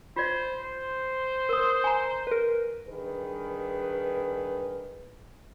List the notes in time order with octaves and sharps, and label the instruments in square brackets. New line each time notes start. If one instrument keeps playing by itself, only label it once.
[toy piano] F4 D5 D#5 [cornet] C5
[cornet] C5
[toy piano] A#4 D#6
G#5 A#5
[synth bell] A#4 B4
[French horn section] G2 D#3 G#4 B4